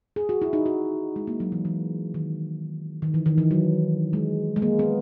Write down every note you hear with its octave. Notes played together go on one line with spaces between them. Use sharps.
G#4
F#4
E4
D#4
F#4
G#3
A#3
F#3
E3
E3
D#3
D#3
E3
D#3
E3
F#3
G#3
G#3
A#3
B3